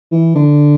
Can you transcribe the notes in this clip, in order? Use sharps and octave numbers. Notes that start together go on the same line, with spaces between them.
E3
D3